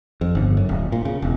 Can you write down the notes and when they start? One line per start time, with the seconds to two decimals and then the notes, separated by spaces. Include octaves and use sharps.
0.21 F2
0.35 G1
0.57 F#2
0.69 D1
0.92 A#2
1.05 C#3
1.22 E1